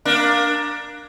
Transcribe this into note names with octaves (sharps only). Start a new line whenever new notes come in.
A#3 D4